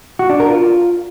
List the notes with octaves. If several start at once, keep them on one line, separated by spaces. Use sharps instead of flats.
F#4
D4
A#4
F4